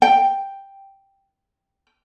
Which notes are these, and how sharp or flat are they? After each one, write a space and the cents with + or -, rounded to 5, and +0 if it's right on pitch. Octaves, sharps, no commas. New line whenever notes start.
G5 +0